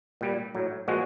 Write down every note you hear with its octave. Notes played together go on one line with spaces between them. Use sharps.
A#2 G3
A2 F#3
A#2 F3 G#3 F#4